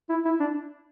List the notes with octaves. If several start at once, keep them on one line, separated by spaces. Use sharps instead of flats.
E4
E4
D4